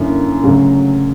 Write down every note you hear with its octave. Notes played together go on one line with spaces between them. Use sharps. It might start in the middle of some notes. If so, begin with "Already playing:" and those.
Already playing: F#2 D3 A#3 E4
D2 C#3 F#3